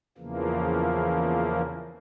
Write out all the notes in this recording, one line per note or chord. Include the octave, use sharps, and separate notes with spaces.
E2 C#3 E3 F3 A#3